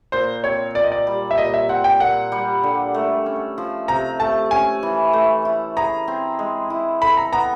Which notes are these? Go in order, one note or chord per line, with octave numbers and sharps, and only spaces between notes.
A#2 C5
C4 C#5
A#2 D5
D#5
D5
G3
E5
A#2 D#5
E5
C4 F#5
G5
A#2 F#5
G3
D3
A3
C#4
F3
C3 A#5
A3 A5
C#4 G#5
E3
A3
E4
G#4 A#5
C4
G#3
E4
A4 B5
A#5
B3 A#5